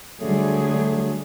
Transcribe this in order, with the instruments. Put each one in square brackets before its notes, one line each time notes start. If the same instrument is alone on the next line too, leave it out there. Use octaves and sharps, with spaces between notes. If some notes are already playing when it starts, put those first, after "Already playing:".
[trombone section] D2 F#3 A3 [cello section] D3 G3 G#4